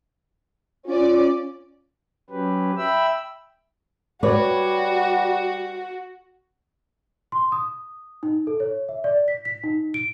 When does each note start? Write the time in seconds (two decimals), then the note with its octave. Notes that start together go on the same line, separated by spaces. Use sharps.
0.87 C#4 F4 D5
2.30 F#3 C#4 G4 B4
2.77 E5 G5 B5 E6
4.23 G3 F#4 B4 C#5 D5
7.32 C6
7.52 D#6
8.23 D#4
8.47 A4
8.60 C#5
8.89 E5
9.04 D5
9.28 B6
9.45 B6
9.64 D#4
9.94 D7